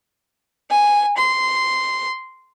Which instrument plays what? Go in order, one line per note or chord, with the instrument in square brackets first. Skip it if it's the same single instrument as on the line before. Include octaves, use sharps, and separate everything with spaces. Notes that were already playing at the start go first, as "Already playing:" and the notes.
[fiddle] G#5
C6